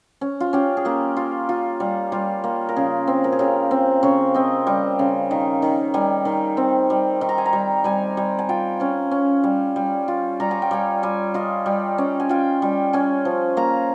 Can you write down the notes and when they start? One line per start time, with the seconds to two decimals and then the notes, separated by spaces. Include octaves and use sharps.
0.21 C#4
0.40 F4
0.53 C#4 G4
0.77 G#4
0.85 A#3 G4
1.17 F4
1.49 F4
1.80 G3
2.12 G3 F4
2.44 A#3
2.69 A#4
2.76 C#3 G#4
3.07 C4
3.24 A#4
3.32 G#4
3.39 C#3 G4
3.71 C4
4.03 C#3 C#5
4.35 C4 D#5
4.67 G3
4.99 C#3
5.31 D#3
5.62 D#3
5.94 G3 G#5
6.25 D#3
6.57 C4
6.90 G3
7.21 D#3
7.29 A#5
7.38 G#5
7.46 A#5
7.53 G3
7.84 G3 G#5
8.17 G3
8.39 G#5
8.49 F4 G5
8.80 C#4 G#5
9.11 C#4
9.44 G3
9.76 G3
10.08 F4
10.40 G3 A#5
10.51 G#5
10.62 G5
10.71 G3 G#5
11.03 G3 G#5
11.34 F4 D#5
11.66 G3
11.98 C#4
12.20 G#5
12.29 F4 G5
12.62 G3
12.93 C#4 G#5
13.25 F3
13.57 A#3 A#5